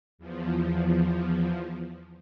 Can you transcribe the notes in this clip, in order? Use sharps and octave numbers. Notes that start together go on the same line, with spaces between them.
E2 F3